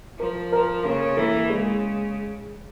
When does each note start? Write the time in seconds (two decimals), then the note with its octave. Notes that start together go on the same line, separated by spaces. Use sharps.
0.19 F3 A#4
0.52 A#4
0.85 C#3 A#3
1.17 E3 A#3
1.50 C#3 G#3